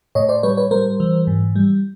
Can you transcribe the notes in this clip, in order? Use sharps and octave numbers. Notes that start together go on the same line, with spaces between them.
A2 C#5 D#5
C5 D5
G3 B4 C#5
B4 C#5
G3 A#4 C5
E3
G#2
G3